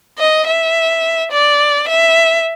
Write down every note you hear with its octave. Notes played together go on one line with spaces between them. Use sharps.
D#5
E5
D5
E5